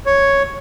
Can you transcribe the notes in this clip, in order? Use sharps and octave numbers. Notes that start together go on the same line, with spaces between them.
C#5